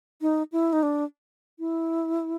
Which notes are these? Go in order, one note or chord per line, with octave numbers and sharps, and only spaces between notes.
D#4
E4
D#4
D4
E4